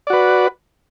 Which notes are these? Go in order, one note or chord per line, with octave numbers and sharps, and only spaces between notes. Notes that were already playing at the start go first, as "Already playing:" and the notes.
F#4 B4 D5